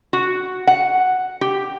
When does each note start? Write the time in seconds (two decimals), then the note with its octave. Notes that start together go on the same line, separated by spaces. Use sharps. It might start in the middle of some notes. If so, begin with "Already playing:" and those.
0.13 F#4
0.67 F#5
1.41 G4